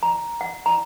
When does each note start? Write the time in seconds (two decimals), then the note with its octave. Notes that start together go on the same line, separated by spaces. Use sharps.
0.03 A#5
0.41 F#5
0.66 A#5